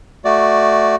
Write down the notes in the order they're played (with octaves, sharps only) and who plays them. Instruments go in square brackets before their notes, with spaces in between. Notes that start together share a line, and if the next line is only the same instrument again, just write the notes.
[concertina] A3 F#4 D5